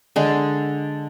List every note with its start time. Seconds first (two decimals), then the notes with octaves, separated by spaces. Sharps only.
0.16 D3 G#3